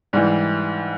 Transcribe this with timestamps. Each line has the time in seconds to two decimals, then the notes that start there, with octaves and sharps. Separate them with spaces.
0.13 G#2 E3 G3